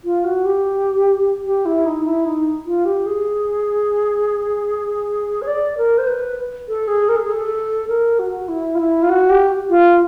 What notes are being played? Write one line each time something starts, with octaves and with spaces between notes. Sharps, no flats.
F4
F#4
G4
G4
E4
D#4
E4
D#4
F4
G4
G#4
C#5
D5
A#4
C5
B4
A4
G#4
A#4
A4
G#4
A4
A#4
F#4
E4
F4
E4
F4
F#4
G4
F4